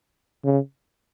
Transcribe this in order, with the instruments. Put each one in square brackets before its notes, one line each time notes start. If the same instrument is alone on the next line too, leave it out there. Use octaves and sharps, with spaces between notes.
[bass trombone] C#3